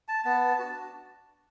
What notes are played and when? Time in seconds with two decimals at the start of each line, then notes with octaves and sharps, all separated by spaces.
0.08 A5
0.25 B3 A5
0.59 D4 F#4 A5